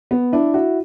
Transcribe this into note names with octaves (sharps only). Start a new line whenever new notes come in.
B3
D4 E4
E4 F#4